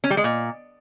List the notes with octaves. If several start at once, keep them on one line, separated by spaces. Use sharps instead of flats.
C#4
G3
G#3
A#2